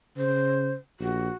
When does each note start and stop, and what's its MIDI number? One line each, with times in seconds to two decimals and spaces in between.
0.17 0.74 49
0.17 0.72 72
1.00 1.29 34
1.00 1.36 66